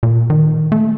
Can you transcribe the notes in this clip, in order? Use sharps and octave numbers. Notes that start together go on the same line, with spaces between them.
A#2
D#3
A3